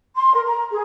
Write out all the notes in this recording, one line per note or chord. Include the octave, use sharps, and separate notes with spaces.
C6
A#4
A#5
G#4